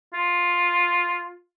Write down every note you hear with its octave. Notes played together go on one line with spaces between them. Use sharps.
F4